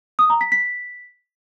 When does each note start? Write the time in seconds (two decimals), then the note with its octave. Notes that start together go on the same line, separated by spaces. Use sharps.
0.19 D#6
0.30 A#5
0.41 B6
0.52 B6